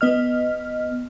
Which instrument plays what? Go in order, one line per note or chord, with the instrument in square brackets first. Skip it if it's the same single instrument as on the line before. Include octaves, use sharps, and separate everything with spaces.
[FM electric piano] B3 D#5 F6